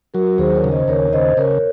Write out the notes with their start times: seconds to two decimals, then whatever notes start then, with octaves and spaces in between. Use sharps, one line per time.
0.14 F#3 F#4 A#4
0.38 D#2 G#4 C5
0.55 A#4 C#5
0.64 C#3
0.72 C5 D#5
0.88 D#2 A#4 C#5
1.12 C#3 C5 D#5
1.37 C#3 A#4 C#5